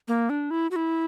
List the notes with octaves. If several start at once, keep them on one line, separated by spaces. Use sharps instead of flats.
A#3
D4
E4
F#4
E4